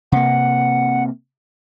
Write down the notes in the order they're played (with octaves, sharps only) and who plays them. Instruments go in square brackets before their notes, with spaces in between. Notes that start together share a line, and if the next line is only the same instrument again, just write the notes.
[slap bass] C3 A#3 [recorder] F#5